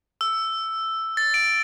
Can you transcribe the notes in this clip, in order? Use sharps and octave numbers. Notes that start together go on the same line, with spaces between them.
E6
A6
D7